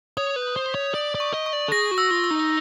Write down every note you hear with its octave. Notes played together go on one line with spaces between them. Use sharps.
C#5 D#6
B4
G6
C5
B6
C#5
D5 D7
D5
C#6
D#5
C#6
D5
A4
G#4 A#6
F#4
E6
F4
E6
D#4